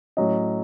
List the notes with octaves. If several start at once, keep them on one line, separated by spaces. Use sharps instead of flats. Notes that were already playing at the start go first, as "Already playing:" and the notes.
A2 F#3 C#4 D#5